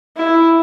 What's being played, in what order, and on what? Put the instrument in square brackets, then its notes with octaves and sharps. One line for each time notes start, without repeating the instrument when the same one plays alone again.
[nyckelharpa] E4